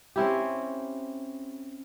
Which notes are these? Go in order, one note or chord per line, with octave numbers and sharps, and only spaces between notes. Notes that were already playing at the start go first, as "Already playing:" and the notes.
C4 C#4 E4 G4